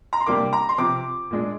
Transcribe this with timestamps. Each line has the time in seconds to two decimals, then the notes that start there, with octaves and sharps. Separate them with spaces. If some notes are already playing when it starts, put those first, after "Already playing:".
0.13 A#5
0.20 C6
0.26 C3 G3 A#3 D4 D6
0.53 A#5
0.69 C6
0.78 C3 F3 C4 D6
1.31 A#2 G#3 D4